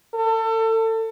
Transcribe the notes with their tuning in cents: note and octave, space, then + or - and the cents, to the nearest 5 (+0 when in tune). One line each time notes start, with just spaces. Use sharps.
A4 +30